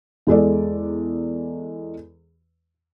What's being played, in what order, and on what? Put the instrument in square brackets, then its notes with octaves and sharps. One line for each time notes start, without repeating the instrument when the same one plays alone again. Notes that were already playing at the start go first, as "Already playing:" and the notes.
[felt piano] E2 G#3 A4 D5